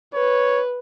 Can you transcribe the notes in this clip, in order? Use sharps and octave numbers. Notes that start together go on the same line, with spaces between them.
B4 C#5